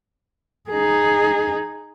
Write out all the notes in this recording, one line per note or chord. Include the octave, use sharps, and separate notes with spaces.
D#4 G#4